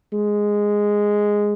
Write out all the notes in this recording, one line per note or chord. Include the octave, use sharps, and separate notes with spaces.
G#3